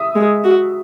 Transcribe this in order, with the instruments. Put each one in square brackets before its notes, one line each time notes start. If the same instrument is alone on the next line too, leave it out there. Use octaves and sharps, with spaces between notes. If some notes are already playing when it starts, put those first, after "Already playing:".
Already playing: [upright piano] E5 D#6
[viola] G#3
F#4